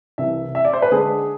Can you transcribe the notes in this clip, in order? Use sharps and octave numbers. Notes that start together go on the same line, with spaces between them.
C2 C3 E3 E5
E5
D5
C5
B4
D3 G#3 D4 G#4